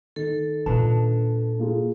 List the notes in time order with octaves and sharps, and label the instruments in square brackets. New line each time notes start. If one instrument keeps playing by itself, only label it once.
[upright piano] D#3 [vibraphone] A4
[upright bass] A#2 [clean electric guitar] D4 B4 A5
[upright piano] A#3 F4 G#4